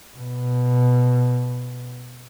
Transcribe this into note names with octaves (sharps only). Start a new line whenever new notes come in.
B2